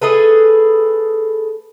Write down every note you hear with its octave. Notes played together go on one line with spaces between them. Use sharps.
A3 G#4 A4 B4